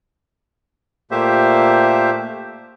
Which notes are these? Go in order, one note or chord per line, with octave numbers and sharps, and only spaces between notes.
A#2 A3 A#3 G4 C5 E5